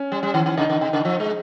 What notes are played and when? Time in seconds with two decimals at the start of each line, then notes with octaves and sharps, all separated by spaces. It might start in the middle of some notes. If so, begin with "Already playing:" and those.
Already playing: C#4
0.12 G3
0.23 G3
0.34 D#3
0.46 D#3
0.57 C#3 D#4
0.70 C#3
0.81 C3
0.93 C#3
1.05 F3
1.20 G#3